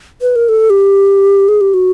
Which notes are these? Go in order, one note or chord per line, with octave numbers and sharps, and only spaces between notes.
B4
A#4
A4
G4
G#4
G4
F#4